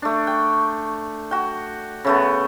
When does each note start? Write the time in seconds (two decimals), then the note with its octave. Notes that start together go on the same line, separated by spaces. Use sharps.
0.02 A3 D4
0.27 G5
1.31 F#4 G5
2.05 C#3 A3 B3